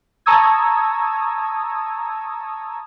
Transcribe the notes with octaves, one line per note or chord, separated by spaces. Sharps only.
A5 A#5 C#6 D#6 E6 G#6